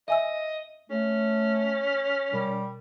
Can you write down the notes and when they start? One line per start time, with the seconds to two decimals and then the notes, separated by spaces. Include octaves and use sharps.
0.08 D#5 E5 G#5 E6
0.90 A3 C#4
2.33 B2 G3